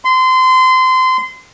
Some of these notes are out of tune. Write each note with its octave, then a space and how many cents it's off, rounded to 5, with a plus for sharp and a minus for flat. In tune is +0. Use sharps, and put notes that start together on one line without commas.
C6 -25